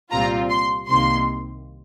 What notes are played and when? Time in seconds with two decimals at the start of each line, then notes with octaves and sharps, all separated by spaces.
0.11 C2 A#2 G3 C4 F4 A#5
0.50 C6
0.88 C2 C3 D#3 A#3 C6